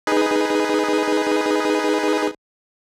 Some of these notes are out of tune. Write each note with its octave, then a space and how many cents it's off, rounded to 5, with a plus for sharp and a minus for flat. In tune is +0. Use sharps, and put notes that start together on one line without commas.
D#4 +0 G#4 +0 B4 +0